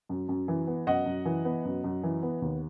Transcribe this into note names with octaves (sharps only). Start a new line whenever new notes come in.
F#2
F#2
E3
B3
F#2 D#5 F#5
F#2
E3
B3
F#2
F#2
E3
B3
D#2